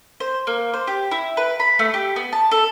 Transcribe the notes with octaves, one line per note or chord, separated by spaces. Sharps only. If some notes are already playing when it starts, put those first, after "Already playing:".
C5
A#3
C5
G4
E4
B4
B5
A3
G4
B3
A5
A4